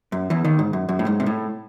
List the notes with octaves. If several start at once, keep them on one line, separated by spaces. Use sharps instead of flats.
F#2
E2 E3
D#2 D#3
G#2
F#2
F#2
A2
G#2
C3
A2